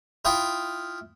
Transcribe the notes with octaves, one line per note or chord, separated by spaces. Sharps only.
E4 F4 G5 D#6